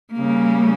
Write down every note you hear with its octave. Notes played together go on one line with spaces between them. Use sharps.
C#3 G3 A#3